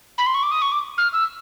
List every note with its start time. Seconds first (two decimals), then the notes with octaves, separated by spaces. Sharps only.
0.18 B5
0.26 C6
0.34 C#6
0.43 D6
0.51 D#6
0.62 C#6
0.72 D6
0.98 F6
1.13 E6